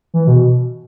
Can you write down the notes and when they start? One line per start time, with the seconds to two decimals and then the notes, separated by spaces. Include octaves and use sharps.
0.14 E3
0.27 B2